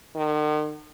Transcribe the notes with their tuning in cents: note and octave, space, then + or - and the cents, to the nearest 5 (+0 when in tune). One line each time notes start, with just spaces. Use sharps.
D#3 -45